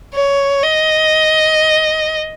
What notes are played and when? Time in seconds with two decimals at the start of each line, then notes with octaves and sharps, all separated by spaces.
0.15 C#5
0.64 D#5